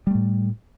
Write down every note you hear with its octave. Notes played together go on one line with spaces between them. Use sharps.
A2 G3 A3